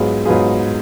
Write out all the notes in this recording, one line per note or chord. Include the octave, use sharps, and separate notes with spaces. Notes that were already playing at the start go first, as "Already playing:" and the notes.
Already playing: G#2 F#3 B3 F4 G#4
G#2 F#3 B3 F4 G#4